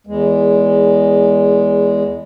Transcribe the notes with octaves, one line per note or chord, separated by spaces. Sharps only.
E2 G#3